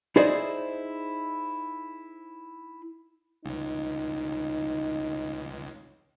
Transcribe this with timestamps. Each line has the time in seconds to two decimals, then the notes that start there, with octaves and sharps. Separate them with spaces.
0.16 D#4 E4 G#4 C5 D5 D#5
3.45 C#2 D#4